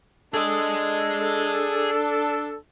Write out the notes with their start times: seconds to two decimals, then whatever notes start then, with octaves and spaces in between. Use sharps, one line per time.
0.34 D4 G#4 A4 D#5